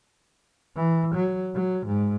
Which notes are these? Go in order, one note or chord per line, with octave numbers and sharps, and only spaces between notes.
E3
F#3
F#3
G#2